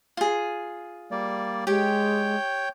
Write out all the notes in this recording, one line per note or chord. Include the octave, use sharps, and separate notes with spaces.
F4 G#4
G3 A#3 D5
G#3 G4 C#5 G5 G6